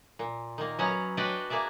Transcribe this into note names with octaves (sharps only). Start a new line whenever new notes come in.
A#2
D#3 A#3
F#3 B3 C#4 A#5
D4 F#4 B4 D5 D#5 G5
A#3 G#4 D5 E5